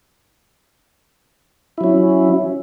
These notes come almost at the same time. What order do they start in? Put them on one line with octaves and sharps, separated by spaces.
E4 F#3 C#4